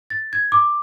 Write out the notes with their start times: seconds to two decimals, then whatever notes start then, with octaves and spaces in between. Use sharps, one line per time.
0.10 A6
0.33 G#6
0.52 D6